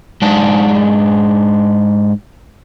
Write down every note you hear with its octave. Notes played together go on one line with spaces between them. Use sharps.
G#2 D4